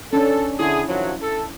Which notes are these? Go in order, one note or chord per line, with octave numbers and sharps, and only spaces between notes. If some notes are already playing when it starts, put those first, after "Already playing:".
C#4 D4 A4
D3 E4 G#4
D#3 F3 F#3
A4